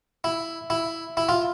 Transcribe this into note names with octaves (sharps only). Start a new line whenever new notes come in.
E4
E4
E4
F4